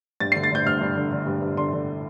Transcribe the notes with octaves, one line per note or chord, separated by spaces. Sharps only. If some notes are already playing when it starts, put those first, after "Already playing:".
G2 A6
C7
D3
A6
D3 G6
G2 F6
G2
D3
D3
G2
G2
D3 C6
D3